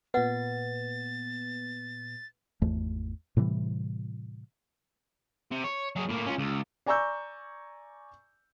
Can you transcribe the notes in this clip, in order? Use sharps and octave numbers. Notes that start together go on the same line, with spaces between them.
A#2 B3 B4 F#5 A6
G#1 E2 A3
A2 C3 E3 G3
C3
C#5
F#3 G#4
A2 A#3
C#4 F4
C#2
D5 G#5 A#5 C#6 E6 G6